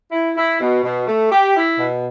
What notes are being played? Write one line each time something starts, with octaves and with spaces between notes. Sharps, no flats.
E4
E4
B2
B2
A3
G4
E4
B2